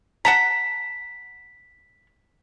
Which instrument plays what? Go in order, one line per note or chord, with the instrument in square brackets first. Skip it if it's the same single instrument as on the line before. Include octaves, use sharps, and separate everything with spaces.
[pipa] F#5 A5 A#5 [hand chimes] B6